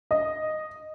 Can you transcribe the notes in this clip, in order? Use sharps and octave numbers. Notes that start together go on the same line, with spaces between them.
D#5